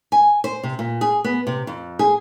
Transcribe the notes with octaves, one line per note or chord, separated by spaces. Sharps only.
G#5
C5
C3
A#2
G#4
B3
C3
F2
G#4